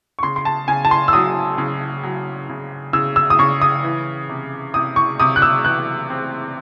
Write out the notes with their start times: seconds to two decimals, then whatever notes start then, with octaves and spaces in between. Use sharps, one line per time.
0.19 C#6
0.23 C#3 C6
0.36 C6
0.45 A5
0.68 C#3 G#5
0.85 A5
0.91 C6
1.08 E6
1.13 F#3 D#6
1.58 C#3
2.03 F#3
2.49 C#3
2.93 C#3 E6
3.16 E6
3.30 D#6
3.39 C#3 C#6
3.62 D#6
3.83 E3
4.29 C3
4.74 C3 D#6
4.96 C#6
5.20 C3 D#6
5.36 F#6
5.42 E6
5.65 E3 F#6
6.10 C4